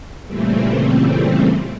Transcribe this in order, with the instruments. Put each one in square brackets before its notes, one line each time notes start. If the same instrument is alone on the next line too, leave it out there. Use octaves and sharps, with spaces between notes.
[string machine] A#2 C#3 E3 G3 A3 C4